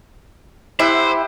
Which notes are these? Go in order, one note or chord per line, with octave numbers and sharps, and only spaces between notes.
E4 G4 C5 E5 F#5